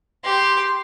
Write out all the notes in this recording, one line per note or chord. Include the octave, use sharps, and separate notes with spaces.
G4 C6